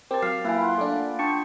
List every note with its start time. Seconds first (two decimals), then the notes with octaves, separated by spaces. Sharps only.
0.11 C4 G4 A#4 A5
0.22 F#3 F5 F6 C7
0.44 A#3 E4 B4 F5 G#5 B5
0.62 F4 F#5
0.78 A3 D4 D5
1.19 D4 G5 A5 C#6 C#7